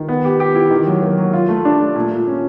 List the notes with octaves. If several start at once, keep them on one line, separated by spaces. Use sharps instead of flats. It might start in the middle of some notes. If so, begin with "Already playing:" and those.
Already playing: D#3
B3
G4
G4
E4
D#3
F#3
A#3
F#3
F4
A3
D4
A3
A#2
A#2
C#4